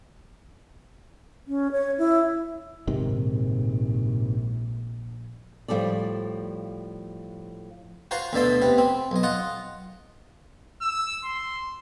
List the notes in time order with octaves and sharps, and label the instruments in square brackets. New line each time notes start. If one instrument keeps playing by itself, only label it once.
[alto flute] C#4
C#5
E4
[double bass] A#1 [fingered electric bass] G#2 C3 D#3
[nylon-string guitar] A2 F3 G3 A4 D5
[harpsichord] F4 F#4 C5 A#5 C6
D2 B2 D3 D5 E5 C6
C3 B3
C4
B1 D#5
F4 D#5 F#5
[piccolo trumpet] E6
C6